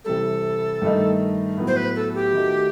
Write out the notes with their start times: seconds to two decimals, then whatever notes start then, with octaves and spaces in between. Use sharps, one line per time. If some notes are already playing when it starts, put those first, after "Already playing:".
0.05 C3 E3 G3 A4
0.82 G2 D#3 A3 D#4
1.58 A2 F#3 B3
1.67 C5
1.76 B4
1.96 A4
2.15 G4
2.33 D#3 A3 D#4 F#4